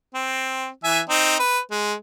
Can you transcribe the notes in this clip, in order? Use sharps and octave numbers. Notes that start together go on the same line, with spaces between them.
C4
E3 E5 G#5
C4 D#4
B4
G#3